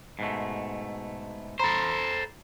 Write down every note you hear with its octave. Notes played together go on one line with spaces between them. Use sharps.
G#2 B2 A3
A4 C5 A#5 B5